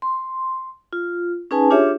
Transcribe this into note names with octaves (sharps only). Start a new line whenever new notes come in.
C6
F4
C#4 D#4 G#4 B4 G#5 A5
D4 F4 G4 G#4 C#5 E5